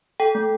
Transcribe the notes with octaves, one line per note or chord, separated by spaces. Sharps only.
A4 G5
A3